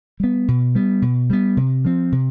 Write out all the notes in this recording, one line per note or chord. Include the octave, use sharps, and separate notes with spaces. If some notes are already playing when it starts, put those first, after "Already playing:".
G3 B3
B2
G3 B3
B2
G3 B3
C3
F3 C4
C3